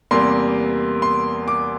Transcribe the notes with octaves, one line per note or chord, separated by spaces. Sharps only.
E2 C3 G3 A#3 C6
C6
D6